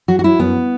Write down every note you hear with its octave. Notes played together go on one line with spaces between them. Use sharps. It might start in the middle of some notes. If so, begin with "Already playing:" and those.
F#3 F#4
F#4
F#3 E4
F#2 B3